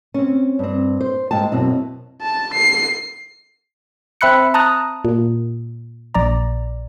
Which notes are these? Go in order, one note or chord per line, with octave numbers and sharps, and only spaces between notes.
C4 C#4
G2 C4
C5
G#2 G5 A5
F#2 B2 C4 E4
A5
C7
C4 E5 B5 F#6 C#7
A5 A#5 D#6 F#6
A#2
A#1 D5 A#5